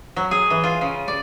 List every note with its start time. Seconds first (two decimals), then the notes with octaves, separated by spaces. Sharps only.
0.16 F#3
0.31 G#4
0.50 E3
0.64 F4
0.81 C#3
1.08 D5